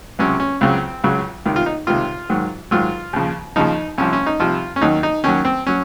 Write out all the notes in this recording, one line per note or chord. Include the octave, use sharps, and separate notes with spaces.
C#2 C3 F#3 C#4
C#4
C#2 C#3 F#3 C4
C#2 C#3 F#3
C#2 C3 D#3
F4
D#4
C#2 C3 D#3 F4
G#2 D#3 F#3
G#2 D#3 F#3 F4
D#2 C#3 F3
D#2 C#3 F3 D#4
C2 C3 F3 C#4
C#4
D#4
C2 C3 F3 F4
C#4
D#2 D#3 F#3 D#4
D#4
D#2 D#3 F#3 C#4
C4
F#3 C#4